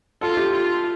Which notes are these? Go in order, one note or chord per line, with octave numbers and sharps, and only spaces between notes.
F4 A4
G4
F4